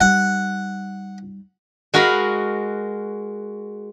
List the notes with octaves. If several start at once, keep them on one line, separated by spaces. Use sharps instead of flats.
G3 D#4 F#5
G#3 F#4 A#4 F5 B5